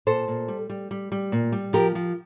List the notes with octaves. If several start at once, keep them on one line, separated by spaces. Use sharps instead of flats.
A#2 A4 C5
A#2
G3
G3
G3
G3
A#2
G3
F3 G4 A#4
F3